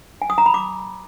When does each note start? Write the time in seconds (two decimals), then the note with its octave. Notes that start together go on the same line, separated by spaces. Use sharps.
0.22 G#5
0.30 D#6
0.38 A#5
0.46 B5
0.54 D6